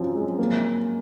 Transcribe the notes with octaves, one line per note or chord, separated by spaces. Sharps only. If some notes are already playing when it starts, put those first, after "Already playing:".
Already playing: F#2 F3 C4
G#3
A#3